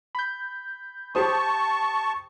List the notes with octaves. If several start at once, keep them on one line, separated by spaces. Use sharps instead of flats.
B5 G6
G4 C5 A5 C#6 D#6